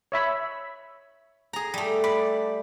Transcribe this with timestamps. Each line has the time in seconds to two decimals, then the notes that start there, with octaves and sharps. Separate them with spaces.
0.12 C#5 E5 B5
1.53 G#4 A#5
1.74 G3 A3
2.04 D5 B5